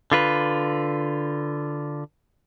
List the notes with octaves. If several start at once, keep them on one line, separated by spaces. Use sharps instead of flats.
D3 F4 B4